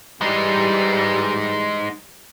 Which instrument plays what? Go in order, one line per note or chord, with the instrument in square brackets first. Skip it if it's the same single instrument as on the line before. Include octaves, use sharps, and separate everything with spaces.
[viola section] E3 G3 [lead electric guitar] G#3 D#4